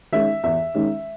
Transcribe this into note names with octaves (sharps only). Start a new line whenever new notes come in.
D#3 G#3 C#4 E5
E2 E5
D#3 G#3 C#4